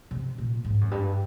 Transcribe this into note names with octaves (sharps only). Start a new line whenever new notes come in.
C3
A#2
G#2
F#2
G2